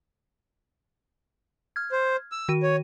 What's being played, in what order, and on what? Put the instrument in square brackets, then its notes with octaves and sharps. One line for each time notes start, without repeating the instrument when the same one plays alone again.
[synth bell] F6 G#6
[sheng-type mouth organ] C5
E6
[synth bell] D#3 F#4 D#7
[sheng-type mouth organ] C#5